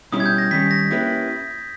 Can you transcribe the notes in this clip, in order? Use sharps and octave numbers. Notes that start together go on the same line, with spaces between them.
B2 G3 C#4 E4 G4 D#6
G#6
G6
A#6
D#3 G3 C#4 G4 B6
A#6
A#3 C#4 E4 G4 B4